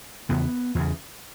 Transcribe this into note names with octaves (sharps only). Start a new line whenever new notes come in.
E2 C#3 B3
E2 C#3